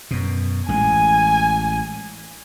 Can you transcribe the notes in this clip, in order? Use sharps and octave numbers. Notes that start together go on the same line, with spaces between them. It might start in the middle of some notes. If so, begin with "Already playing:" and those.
F#2 B2
A1 G#3 G#5